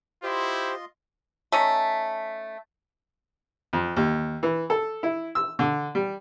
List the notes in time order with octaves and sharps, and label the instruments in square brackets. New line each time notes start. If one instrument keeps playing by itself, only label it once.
[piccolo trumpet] E4 [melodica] F4 D#5 C6 [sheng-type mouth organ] G4 C5
[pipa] A3 C#4 D#4
[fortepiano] F2
D#2
E3
A4
E4
E6
D3
G3